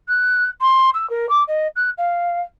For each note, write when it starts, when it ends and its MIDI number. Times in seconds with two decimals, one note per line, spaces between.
0.08 0.47 90
0.61 0.90 84
0.94 1.08 88
1.09 1.28 70
1.29 1.43 86
1.47 1.67 75
1.76 1.90 90
1.97 2.41 77